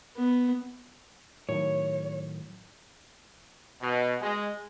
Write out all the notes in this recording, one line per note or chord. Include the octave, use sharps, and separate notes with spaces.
B3
A2 D#3 F#3 C#5
B2
G#3